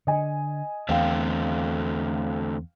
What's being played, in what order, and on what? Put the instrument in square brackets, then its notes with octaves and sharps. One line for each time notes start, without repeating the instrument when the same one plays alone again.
[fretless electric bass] D3 [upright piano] D#5 G#5
[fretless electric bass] E2 [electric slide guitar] D3 A3 C4 [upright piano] F5 G5